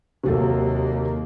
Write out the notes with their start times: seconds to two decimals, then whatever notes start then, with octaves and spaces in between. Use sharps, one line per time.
0.23 D#2 C3 F#3 A#3 A4